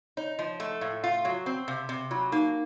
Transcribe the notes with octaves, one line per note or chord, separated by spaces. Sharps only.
D#4 C#5
F3 D#5
A3 F#5
A2 F5
F4 F#5
F#3 F#5
C4 F#5
C3 F5
C3
F#3 F4
A#3 D#4